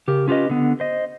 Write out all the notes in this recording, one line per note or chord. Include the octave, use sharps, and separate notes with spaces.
C#3 G4 A#4
C#4 F4 G4 B4 D#5
D3 B3
C5 D#5